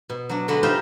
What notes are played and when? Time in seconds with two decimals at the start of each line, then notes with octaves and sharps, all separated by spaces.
0.10 B2
0.29 F#3 D4
0.48 D3 G#3 D4 F#4 B4
0.63 G3 D#4 F4 A#4 C5 E5